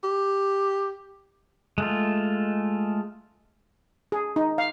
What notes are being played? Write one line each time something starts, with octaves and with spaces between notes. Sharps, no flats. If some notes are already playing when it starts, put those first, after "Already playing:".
G4
G#3 A3 F4
G#4
D#4
F5